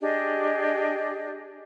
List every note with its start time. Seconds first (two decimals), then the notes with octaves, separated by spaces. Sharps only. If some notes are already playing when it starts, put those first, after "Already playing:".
0.01 D4 G4 G#4 D#5